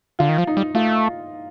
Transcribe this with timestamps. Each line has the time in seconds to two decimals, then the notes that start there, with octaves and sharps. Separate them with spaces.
0.19 D3 F4
0.29 D#3
0.38 F3
0.47 D#4
0.57 G3
0.75 A3 F4